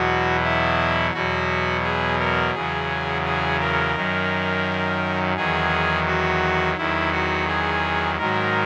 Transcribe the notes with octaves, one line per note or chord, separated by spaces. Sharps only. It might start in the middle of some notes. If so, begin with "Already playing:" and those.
Already playing: E2 B2 F#3 F#4
E4
E2 B2 F#3 F#4
G#4
A#4
E2 C#3 F#3 G#4
G#4
A#4
F#2 D#3 F#3
E2 D#3 F#3 G#4
F#4
E2 D#3 F#3 E4
F#4
G#4
G#2 D#3 F#3 A#4